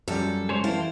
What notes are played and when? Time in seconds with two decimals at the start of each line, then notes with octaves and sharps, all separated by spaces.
0.08 F#2 F3 G3 A4
0.49 C#3 G#3 G#4 C5 C#5
0.64 E3 E4 C5 F5 G5 A5